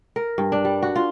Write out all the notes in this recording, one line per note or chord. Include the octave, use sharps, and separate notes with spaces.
A#4
G2
D4
G3
F#4
F4